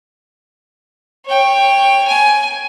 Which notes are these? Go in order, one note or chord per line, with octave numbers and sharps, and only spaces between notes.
C#5 G5
G#5